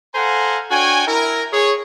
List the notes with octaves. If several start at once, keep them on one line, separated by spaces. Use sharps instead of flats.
A4 C5 F5 F#5 G#5 A#5
D4 F#4 C#5 G5 G#5
E4 A#4
G#4 C#5